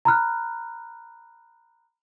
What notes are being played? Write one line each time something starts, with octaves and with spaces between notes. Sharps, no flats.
A#5 B5 F6 F#6